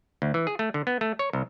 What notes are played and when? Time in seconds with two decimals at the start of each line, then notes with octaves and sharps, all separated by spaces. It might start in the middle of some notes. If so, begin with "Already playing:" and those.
0.22 D2
0.34 E3
0.47 G#4
0.59 A3
0.74 D3
0.87 B3
1.01 A3
1.19 C#5
1.33 C2